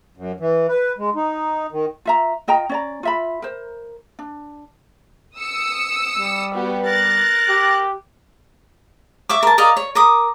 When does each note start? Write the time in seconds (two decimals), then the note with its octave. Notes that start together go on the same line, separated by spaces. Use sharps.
0.17 F#2
0.40 E3
0.69 B4
0.98 G#3
1.15 D#4
1.72 D#3
2.05 F4 E5 A#5
2.48 F4 D#5 G5 A#5
2.69 C#4 D5 A#5
3.03 F4 E5 B5
3.42 A#4 C5
4.19 D4
5.39 D#6 E6 C#7
6.16 G3
6.55 B3 F#4 G4
6.86 A#4 F#6 A6
7.48 G4
9.29 E5 C#6 D6
9.43 A#4 A5
9.58 A#4 D5 D#5 F5
9.77 C#5
9.95 A#4 D6 D#6